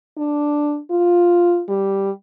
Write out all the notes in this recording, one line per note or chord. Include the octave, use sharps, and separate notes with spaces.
D4
F4
G3